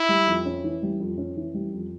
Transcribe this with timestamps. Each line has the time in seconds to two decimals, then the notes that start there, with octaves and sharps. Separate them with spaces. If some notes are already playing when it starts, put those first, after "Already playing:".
Already playing: E4
0.09 G3
0.27 F2
0.45 C#4
0.64 E3
0.83 G3
1.00 F2
1.18 C#4
1.37 E3
1.54 G3
1.73 F2